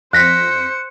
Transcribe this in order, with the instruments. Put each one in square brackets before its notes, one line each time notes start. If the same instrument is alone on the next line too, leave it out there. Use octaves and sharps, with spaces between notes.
[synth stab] F2 A#6 B6 [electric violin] C5 C#7 [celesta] F#6